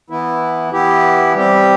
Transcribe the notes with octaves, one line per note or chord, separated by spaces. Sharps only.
E3 B3 E4
E3 B3 E4 G4
G3 C4 G4